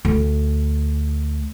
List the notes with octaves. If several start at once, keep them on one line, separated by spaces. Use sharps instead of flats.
D2